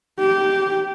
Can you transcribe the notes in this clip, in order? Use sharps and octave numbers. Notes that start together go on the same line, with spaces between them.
G4